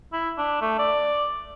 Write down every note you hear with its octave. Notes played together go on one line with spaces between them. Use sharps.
E4
D4
A3
D5